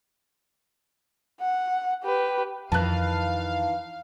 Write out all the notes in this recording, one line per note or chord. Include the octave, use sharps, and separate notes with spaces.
F#5
G4 B4
F2 D#3 E3 F5 A5 F#6